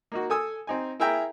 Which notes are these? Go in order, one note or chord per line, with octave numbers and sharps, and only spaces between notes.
A#3 D#4 F#4
A4 G#5 D#6 E6
C4 D#4 G#5
E4 G#4 A#4 E5 G5 A#5